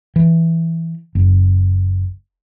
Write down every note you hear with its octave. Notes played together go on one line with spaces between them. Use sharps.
E3
F#1